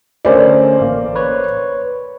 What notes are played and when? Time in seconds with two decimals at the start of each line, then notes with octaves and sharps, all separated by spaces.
0.25 D3 A3 C#4 A#4 C5 D5
0.81 A1 A#3
1.15 B4 C#5